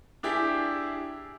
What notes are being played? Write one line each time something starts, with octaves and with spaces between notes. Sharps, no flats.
D4 E4 G4 G#4